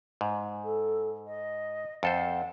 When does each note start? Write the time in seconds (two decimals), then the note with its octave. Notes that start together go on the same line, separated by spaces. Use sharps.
0.21 G#2
0.63 A4
1.26 D#5
2.03 F2 A4 C5 F#5